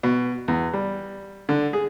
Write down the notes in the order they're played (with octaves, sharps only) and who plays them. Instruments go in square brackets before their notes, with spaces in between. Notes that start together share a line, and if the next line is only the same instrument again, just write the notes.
[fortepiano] B2
E2
G3
D3
G#4